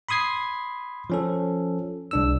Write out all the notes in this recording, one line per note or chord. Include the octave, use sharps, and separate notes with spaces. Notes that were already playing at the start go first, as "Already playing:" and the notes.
B5 C6 D#6 G#6 C7
F3 C#4 A4
C2 D4 E6